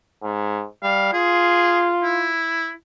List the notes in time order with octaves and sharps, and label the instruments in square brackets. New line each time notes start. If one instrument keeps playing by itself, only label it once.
[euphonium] G#2
[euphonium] G3 [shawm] F5
[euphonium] F4 [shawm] G#4
[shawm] E4